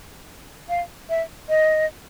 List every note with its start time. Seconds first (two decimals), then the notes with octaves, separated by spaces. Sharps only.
0.69 F5
1.10 E5
1.49 D#5